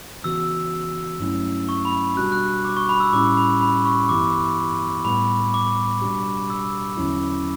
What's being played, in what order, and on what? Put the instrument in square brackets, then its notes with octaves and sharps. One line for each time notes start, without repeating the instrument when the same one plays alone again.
[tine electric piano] C#3 E3 B3 F#4 [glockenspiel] E6
[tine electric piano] G2 F#3 A3 C#4 E4
[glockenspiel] C#6
B5
[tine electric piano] B2 G3 D4 F#4 [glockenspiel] F#6
[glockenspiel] F#6
D6
C#6
B5
E6
[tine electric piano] A2 G3 C#4 E4 G4 [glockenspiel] D6
[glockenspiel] B5
B5
C#6
[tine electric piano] G2 E3 B3 E4 G4 [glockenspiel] D6
[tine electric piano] A2 G3 B3 [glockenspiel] B5
[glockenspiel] D6
[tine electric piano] B2 G3 D4 G4
[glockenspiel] E6
[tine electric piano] E2 D3 F#3 C#4 E4